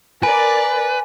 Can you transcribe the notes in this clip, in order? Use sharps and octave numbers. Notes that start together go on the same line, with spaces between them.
A#4 B4 D5 G#5